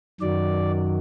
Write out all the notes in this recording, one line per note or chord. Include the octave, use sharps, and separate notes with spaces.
F#2 D#3 F#3 D5